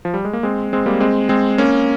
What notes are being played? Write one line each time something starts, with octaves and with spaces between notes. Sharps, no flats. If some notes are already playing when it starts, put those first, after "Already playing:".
F3
G3
G#3
A#3
G#3 C4
G#3 C4
G3 A#3
G#3 C4
G#3 C4
A#3 C#4